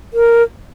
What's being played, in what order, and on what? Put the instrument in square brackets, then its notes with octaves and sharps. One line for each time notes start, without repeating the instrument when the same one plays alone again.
[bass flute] A#4